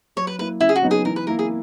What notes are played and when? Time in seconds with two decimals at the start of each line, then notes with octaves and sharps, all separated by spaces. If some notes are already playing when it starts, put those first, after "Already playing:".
0.16 F#3 C#5
0.27 B4
0.38 A#3 E4 B4
0.60 C#3 E4
0.69 G#4
0.76 F#4
0.82 F#3 B3 D#4
0.91 G#4
1.05 E3 A#4
1.16 B4
1.27 A#3 E4 A#4
1.39 G#4